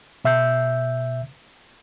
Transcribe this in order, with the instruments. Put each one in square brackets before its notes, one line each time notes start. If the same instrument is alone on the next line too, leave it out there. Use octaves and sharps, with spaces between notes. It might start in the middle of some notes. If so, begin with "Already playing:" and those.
[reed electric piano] B2 E5 E6 G6